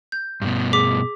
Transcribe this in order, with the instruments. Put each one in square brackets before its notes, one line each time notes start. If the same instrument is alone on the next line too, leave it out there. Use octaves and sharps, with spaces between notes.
[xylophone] G6
[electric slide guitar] G2 B2
[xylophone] G#4 D6 B6